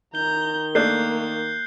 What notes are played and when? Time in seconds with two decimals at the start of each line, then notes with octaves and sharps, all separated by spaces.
0.15 D#3 A#5 G6 G7
0.75 A3 A#3 D4 F#6 G6 C7